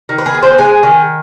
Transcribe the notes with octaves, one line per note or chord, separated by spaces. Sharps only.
D#3
B4
G#4
B3
C5
G#3 G#5
D#3